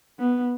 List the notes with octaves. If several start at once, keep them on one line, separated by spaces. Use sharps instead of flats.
B3